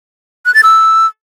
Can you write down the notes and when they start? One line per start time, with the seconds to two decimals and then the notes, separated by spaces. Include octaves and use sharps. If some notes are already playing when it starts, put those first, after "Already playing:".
0.46 F#6
0.54 A6
0.63 E6